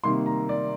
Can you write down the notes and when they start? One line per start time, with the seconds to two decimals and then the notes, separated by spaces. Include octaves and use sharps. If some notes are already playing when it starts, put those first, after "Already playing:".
0.04 C3 D#3 G3 A#3 C6
0.26 A#5
0.49 D5